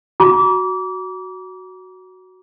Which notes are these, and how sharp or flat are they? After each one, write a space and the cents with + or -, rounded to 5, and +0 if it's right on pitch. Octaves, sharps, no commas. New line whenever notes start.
F#4 +0 A#5 +35 D6 -30